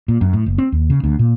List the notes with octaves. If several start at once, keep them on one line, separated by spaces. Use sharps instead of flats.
A#2
F#2
A2
F#1
C4
D#2
C#3
D2
A#2